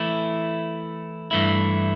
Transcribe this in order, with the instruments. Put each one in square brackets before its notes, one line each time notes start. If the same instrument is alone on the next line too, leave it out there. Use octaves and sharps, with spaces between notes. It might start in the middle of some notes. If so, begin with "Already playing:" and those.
Already playing: [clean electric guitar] E3 A3 E4
G2 E3 A3 E4